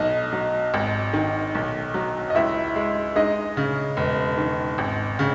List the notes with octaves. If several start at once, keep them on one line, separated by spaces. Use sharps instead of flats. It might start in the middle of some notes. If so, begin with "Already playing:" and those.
Already playing: B1 D#4 D#5
F#3
G#1
D#3
B1
F#3
D#5
C#2 E4 E5
G#3
G#3 D#4 D#5
C#3
E1
D#3
G#1
C#3